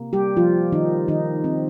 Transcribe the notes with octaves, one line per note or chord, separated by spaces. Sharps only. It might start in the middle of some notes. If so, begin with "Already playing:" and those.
Already playing: C3 A#3
G3 G4
F3 F4
D#3 D#4
D#3 D#4
C4